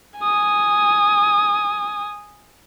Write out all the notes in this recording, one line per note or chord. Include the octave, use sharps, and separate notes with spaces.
G#5 D#6